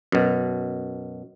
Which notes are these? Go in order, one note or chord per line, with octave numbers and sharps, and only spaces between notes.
F#2 B2